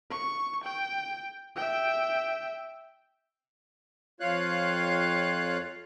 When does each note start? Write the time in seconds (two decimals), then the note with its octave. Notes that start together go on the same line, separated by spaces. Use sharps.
0.11 C#6
0.64 G5
1.56 E5 G5
4.20 F2 F4 C#5 F5 F#6